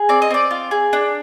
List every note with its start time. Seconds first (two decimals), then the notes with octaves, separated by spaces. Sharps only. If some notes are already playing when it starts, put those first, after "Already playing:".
Already playing: G#4
0.09 C4 D5
0.22 D#5
0.31 C4 D5
0.51 F4
0.71 G#4
0.93 D4